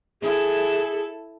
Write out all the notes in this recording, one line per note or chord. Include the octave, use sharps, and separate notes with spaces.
E4 G#4 A4